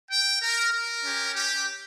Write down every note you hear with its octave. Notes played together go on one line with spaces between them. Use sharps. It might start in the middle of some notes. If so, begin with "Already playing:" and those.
G5
A#4
A#4
C#4 G4
G4